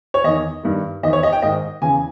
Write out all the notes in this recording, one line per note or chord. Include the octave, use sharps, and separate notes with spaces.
C#5
E2 D#3 D#5
G2 D#3
E2 D#3 D#5
C#5
D#5
G5
G#2 D#3 D#5
E2 C#3 E3 G#5